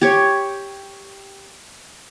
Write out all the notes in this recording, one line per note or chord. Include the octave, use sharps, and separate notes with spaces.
G4 C#5